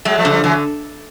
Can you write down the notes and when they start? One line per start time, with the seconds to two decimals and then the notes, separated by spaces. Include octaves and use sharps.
0.05 F#3 G#3 A3
0.18 F3 G3
0.25 D3
0.30 F3 G3
0.44 D3 E3 F#3